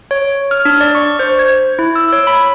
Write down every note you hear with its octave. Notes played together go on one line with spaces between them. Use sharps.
C#5
F6
D4
D5
C#6
C5
G#6
E4
E6
C#5
B5